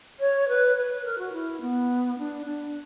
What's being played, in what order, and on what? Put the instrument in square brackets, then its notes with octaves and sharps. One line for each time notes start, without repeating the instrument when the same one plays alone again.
[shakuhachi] C#5
B4
B4
A#4
F#4
E4
B3
D4
D4